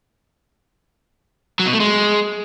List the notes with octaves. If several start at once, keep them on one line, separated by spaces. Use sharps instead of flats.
F#3
B2
A3
G#3